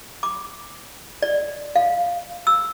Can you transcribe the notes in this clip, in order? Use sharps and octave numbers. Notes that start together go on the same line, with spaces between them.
D6
D5
F5
E6